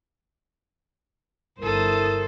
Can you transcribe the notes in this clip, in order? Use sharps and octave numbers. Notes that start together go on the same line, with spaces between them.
G1 E4 A4 A#4 C5 D#6